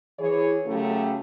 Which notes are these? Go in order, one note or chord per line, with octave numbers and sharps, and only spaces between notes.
E3 G#4 C#5
F#2 C#3 F#3 A3 G4 A4